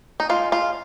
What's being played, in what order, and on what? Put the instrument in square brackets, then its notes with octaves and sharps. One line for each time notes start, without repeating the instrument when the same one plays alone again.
[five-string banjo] D#4
G#3 F4
F4